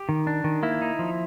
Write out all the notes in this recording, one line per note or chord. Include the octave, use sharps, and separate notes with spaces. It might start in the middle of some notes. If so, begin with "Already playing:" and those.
Already playing: G4
D#3
D4
D#3
A#3 E4
D#4
F3